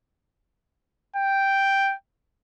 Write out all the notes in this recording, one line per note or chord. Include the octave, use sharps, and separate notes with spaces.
G5